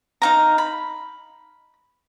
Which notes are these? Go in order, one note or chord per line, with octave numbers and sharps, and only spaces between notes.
D#4 F5 A#5
B5